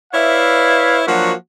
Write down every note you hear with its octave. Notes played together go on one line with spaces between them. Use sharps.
E4 B4 C#5 D5 E5 F5
F3 F#3 A#3 D4 F#4